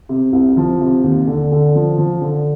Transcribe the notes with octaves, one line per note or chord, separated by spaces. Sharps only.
C3
C2
F3
C3
D#2
D3
D3
F3
F3
D3